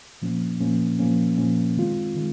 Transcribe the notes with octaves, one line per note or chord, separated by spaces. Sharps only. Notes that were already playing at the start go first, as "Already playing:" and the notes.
A#2 F3 A#3 C#4
A#2 F3 A#3 C#4
A#2 F3 A#3 C#4
A#2 F3 A#3 C#4
D#3 G#3 C4 F4
D#3 G#3